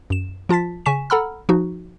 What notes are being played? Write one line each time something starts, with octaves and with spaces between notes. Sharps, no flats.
F#2 E7
F3 F4 A5 A6 B6
C#3 G#5 C#6 B6 E7
A4 F#5 A#5 B5 E6 F6
F3 D#4 F#4